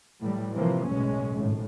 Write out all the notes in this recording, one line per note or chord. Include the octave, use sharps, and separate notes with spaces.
A2 E3 F#3 G3
C3 E3 F3 A#3 C4
F#1 B1 A2 G#3 C#4
G#1 A2